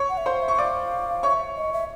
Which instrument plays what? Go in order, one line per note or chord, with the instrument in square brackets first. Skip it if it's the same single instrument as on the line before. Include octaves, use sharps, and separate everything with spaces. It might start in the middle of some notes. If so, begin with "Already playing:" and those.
Already playing: [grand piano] C#5 C#6
[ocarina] F#5
E5
[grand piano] C5 C6 [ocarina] F5
[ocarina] E5
[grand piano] C#6
[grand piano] D5 D6 [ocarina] F5
[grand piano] C#5 C#6 [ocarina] E5
[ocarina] D#5
E5